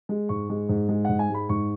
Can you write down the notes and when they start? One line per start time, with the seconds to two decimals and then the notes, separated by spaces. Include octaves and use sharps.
0.09 G#3
0.29 G#2 C#6
0.49 G#3
0.69 G#2
0.89 G#3
1.05 G#2 F#5
1.19 G#5
1.30 G#3 B5
1.49 G#2 C#6